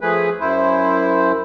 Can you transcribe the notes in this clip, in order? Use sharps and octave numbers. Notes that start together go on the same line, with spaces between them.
F3 A3 G#4 B4
F#2 E4 C5